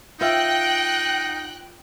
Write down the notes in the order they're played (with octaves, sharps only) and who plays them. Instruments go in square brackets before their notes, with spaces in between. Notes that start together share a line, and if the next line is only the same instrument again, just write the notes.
[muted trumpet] D#4 [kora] F4 C5 E5 [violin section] G5 F#6